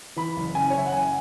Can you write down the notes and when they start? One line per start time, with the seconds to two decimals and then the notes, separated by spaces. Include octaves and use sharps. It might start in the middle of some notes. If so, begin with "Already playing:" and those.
0.16 E3 B5
0.36 F#1
0.55 C#3 G#5
0.70 C#5
0.75 F#2 E5
0.86 F#5
0.93 F#1 G#5